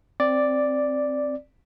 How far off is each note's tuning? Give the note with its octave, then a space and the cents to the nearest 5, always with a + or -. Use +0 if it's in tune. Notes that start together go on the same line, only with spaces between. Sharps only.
C4 +5 D5 +0